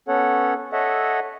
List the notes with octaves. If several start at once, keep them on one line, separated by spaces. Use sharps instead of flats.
B3 C#4 A4 C#5 F#5
A4 C#5 D#5 E5 F#5